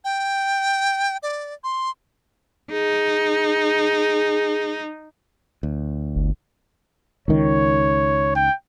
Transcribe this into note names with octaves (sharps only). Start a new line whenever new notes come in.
G5
D5
C6
D#4 G#4
D2
G1
C#2 D#3 C#5
G5